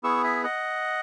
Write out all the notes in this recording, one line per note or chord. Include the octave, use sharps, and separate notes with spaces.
B3 E4 G#4 C#6 E6
E5 G#5
D#5 F#5